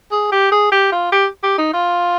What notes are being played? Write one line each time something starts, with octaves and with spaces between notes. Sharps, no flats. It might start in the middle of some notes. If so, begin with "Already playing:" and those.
G#4
G4
G#4
G4
F4
G4
G4
D#4
F4